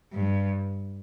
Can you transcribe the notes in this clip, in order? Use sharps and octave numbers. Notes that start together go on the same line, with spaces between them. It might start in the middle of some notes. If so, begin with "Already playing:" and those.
G2